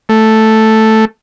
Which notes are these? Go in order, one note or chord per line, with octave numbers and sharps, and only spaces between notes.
A3